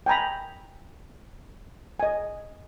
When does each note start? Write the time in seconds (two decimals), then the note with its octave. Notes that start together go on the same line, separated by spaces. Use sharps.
0.06 G5 G#5 A#5 B5
2.00 D#5 G#5